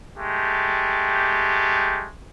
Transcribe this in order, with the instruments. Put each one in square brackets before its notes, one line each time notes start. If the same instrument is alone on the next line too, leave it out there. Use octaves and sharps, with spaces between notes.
[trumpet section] G#3 A3 G4